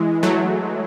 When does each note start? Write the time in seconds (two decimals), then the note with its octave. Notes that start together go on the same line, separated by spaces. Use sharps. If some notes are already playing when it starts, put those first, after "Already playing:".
Already playing: E3 G#3 E4
0.23 F#3 A3